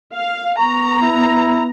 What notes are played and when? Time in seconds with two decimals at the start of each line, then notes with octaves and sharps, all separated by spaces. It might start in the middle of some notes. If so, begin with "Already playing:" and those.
0.15 F5
0.59 B3 A#5 C#6
1.02 E4